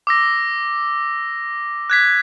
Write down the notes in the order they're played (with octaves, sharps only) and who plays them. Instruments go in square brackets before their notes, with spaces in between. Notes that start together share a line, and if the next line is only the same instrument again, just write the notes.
[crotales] D6 E6 A#6
F#6 G#6 B6